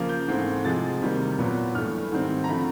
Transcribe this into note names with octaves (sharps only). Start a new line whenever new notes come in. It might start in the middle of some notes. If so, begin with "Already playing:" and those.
Already playing: C#3 F3 A#3
G6
G#2 E3 A3 C4
C3 F3 G#3 C4 A6
C3 D#3 G3 A#3
A#2 F#3 B3
G2 E3 A3 F6
G#2 D#3 G3 C4
A#5
D3 F3 A3 C4 B5